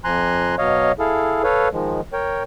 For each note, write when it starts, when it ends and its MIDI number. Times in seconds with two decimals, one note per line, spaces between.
0.04 0.55 41
0.04 0.55 53
0.04 0.55 80
0.04 0.55 82
0.04 0.55 84
0.04 0.55 90
0.58 0.92 47
0.58 0.92 54
0.58 0.92 73
0.58 0.92 75
0.58 0.92 77
0.99 1.43 64
0.99 1.43 68
0.99 1.43 69
0.99 1.43 77
1.44 1.68 69
1.44 1.68 71
1.44 1.68 73
1.44 1.68 77
1.73 2.01 51
1.73 2.01 53
1.73 2.01 56
2.13 2.43 70
2.13 2.43 73
2.13 2.43 79